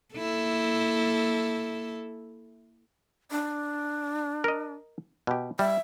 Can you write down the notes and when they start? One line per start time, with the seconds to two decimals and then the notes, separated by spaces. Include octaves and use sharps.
0.15 A#3 E4 A4
3.31 D4
4.44 A#4 D#5
5.27 B2 G4
5.59 G3 E5